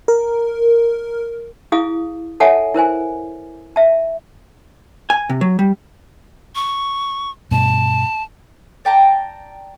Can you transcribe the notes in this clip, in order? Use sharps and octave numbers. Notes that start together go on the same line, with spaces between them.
A#4
E4 G#4 F5 D#6
A4 C#5 E5 F#5 G#5 A5
E4 A#4 C5 G#5
E5 A5
G#5
C3
F#3
G3
C#6
G2 B2 A5
D5 G5 A5 A#5